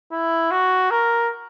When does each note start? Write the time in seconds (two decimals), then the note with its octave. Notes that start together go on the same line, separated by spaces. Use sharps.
0.13 E4
0.51 F#4
0.91 A#4